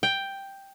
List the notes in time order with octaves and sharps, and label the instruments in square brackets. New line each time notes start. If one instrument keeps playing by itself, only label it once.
[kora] G5